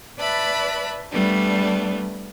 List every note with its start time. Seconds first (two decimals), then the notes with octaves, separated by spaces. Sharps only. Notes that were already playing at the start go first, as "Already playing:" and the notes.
0.18 B4 D5 E5 A5 B5 F#6
1.13 G3 A3 B3 D4